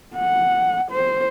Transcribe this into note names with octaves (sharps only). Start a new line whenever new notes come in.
F#5
C5